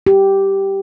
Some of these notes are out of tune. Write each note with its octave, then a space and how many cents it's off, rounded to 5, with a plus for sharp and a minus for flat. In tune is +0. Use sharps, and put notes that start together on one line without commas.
G4 -5